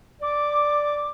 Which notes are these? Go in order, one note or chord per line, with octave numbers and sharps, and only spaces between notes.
D5 D6